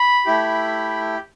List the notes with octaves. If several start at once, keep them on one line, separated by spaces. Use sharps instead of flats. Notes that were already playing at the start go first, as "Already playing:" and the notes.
Already playing: B5
A3 E4 G4